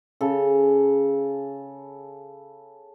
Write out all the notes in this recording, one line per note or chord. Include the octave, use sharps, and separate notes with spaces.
C#3 A4